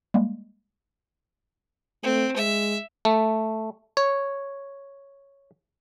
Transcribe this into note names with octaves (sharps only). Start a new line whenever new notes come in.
G3 G#3 A#3
A3 C4
G#3 E5
A3
C#5